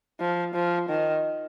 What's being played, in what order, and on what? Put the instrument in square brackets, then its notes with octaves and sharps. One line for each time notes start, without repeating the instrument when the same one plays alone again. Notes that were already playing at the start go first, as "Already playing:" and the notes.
[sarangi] F3
F3
D#3